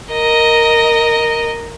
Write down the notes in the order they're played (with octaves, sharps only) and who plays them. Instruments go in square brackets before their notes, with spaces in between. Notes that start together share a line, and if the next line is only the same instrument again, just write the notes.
[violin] A#4 D#5